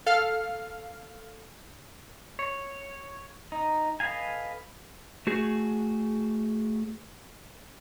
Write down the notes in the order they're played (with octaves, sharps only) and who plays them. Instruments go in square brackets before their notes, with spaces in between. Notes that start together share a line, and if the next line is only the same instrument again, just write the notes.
[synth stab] A4 F5 F6
[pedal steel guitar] C#5
D#4
A4 B4 D#5 F5 G#5
[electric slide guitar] A3 F#4 G#4